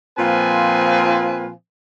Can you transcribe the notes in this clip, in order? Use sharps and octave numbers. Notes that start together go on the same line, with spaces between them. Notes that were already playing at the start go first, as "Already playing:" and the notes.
A#2 F3 C4 F4 B4 G#5